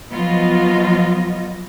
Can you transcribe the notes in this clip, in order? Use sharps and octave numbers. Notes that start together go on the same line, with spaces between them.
F3 F#3 B3 F4 D#5